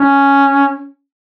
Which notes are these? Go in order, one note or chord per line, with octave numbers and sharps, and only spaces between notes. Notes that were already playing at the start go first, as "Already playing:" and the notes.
Already playing: C#4